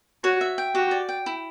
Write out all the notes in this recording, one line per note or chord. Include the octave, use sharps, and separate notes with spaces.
F#4 C#5
E5
G5
F#4 G4
D5
G5
E4